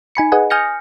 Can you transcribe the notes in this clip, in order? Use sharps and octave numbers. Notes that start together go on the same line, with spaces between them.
D#4 G#5 B5 C#7
G#4 B4 D#5 F#5 G#5
G#5 D#6 F6 G6 A#6 C#7